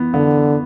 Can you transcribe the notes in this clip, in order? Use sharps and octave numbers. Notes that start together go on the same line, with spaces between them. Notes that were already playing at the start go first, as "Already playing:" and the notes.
Already playing: E3 B3
D3 B3